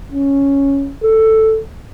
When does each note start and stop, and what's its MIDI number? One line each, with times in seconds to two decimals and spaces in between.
0.12 0.91 61
1.03 1.59 69